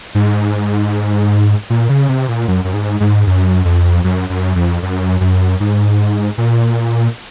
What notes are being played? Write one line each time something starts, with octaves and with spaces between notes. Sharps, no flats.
G#2
A#2
C#3
C3
A#2
F#2
F#2
G#2
G#2
F#2
F2
F#2
F#2
F2
F#2
F#2
G#2
A#2